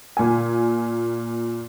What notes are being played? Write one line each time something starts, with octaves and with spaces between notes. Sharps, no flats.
A#2 G#5